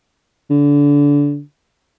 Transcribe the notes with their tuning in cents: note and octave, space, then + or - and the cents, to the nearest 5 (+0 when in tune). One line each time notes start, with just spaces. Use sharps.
D3 -25